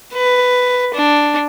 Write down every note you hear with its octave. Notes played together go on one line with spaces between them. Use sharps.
B4
D4